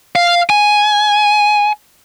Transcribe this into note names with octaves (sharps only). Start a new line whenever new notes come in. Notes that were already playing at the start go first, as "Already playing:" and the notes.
F5
G#5